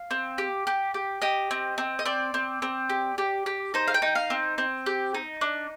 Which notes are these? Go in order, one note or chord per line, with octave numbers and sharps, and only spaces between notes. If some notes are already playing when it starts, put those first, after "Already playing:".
Already playing: F5
C4
G4
G4
G4
G4 D#5
C4
C4
D#5
C4 D5
C4
C4
G4
G4
G4
D#4 C5
F5
G5
D#4
F5
C4
C4
G4
D#4
D4